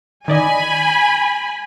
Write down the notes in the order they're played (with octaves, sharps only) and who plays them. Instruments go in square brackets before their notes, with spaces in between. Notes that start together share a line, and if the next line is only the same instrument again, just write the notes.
[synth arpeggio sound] D#3 D5 D#5 [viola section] G#5 B5